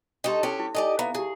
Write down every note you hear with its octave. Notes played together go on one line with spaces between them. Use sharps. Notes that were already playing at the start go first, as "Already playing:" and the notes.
D4 D#4 G4 A4 C6
C#4 E4 F#4 G4 A4 C#5
E4
D#4 G4 A4 D5 D#5 G#5
B3 E5 F5 A#5
E4 G4 G#4